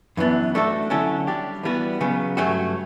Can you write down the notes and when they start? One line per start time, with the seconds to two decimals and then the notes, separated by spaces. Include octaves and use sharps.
0.17 F#2 E3 B3 D4
0.55 A3 D4 F#4 A4
0.90 D3 F#3 C#4 E4 A4
1.27 G3 D4 G4
1.63 E3 G3 B3 F#4
2.01 C#3 F#3 B3
2.37 G2 F#3 A3 C#4 F#4